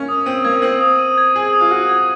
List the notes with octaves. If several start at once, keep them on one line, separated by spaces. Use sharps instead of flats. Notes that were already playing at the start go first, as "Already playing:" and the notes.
Already playing: A#3 C#4
D#6
C4 D#7
A#3 G#6
C4 F#7
D#6
D#7
G#6
G#4 F#7
D#6
F4
F#4 D#7
G#6